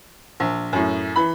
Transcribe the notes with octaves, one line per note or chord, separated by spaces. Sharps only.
A#1
F#2 A2
E3 B5